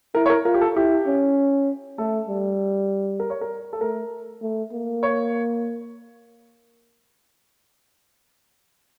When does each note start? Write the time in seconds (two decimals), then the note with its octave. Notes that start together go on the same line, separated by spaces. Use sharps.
0.15 E4 A#4
0.26 C#5
0.30 A#4
0.45 F4 A#4
0.54 G4
0.61 A4
0.76 E4 G4
1.07 C#4
1.98 A3 A4
2.28 G3
3.20 A#4
3.30 C#5
3.41 A#4
3.73 A4
3.81 A3 A#4
4.42 A3
4.73 A#3
5.03 C#5